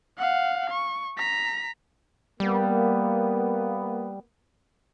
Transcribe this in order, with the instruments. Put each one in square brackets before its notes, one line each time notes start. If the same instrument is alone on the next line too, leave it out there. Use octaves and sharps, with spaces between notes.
[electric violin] F5 F#5
C#6
A#5 B6
[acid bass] G3 [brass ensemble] A#3 B3